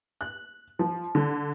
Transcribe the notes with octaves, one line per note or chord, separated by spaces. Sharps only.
F#6
F3
D3